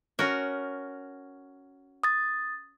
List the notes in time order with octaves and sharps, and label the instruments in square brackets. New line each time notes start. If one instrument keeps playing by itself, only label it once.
[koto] C#4 F#4 A#4
[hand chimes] D#6 A6